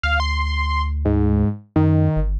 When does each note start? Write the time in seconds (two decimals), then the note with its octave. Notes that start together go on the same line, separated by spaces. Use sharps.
0.03 D2 F5
0.20 C6
1.05 G#2
1.76 F#2 D#3
2.16 G1